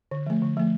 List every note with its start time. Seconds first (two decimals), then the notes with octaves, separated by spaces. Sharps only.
0.11 D3
0.27 F3 A3
0.42 D3
0.57 F3 A3